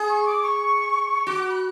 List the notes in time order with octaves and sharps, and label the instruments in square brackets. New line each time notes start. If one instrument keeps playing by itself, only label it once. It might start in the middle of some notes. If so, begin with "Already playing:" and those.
Already playing: [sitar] G#4
[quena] C#6
D6
C#6
[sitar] F#4 [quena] D6
[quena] B5